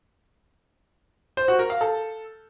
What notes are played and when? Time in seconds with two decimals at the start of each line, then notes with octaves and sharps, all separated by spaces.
1.37 C5
1.48 F#4
1.59 A#4
1.70 F5
1.81 A4